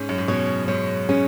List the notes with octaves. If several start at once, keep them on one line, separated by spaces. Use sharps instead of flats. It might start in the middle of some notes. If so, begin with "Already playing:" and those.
Already playing: G#2 C#4
F#2
G#2
B2 C#5
G#2 C#5
G#3 C#4